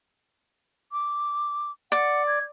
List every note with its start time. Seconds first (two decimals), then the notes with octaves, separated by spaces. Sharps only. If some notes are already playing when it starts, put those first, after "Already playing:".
0.92 D6
1.92 D5 F#5
2.27 G#6